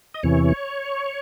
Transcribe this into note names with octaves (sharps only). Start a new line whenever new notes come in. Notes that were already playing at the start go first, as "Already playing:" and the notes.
D#5
E2 C3 E3 C#5